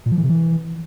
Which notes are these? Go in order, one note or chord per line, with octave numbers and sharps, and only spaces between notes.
A#2
F3
E3
C3
E3